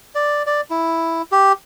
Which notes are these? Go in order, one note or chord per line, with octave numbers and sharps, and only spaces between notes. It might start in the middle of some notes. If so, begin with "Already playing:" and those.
D5
D5
E4
G4